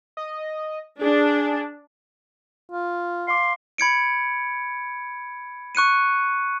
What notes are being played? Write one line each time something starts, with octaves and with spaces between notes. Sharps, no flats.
D#5
D4 G#4
F4
F5 C6 D6
B5 G#6 C#7 D7
C#6 F#6 C#7 D#7